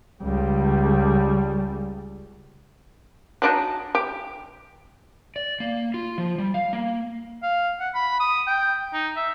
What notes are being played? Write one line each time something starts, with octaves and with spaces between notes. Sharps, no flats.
C#2 G3
F#3 D4 D#4
G4
D5
A#3
F4
F3
G3
F5
A#3
F5
F#5
B5
D#6
G5
D#4
E5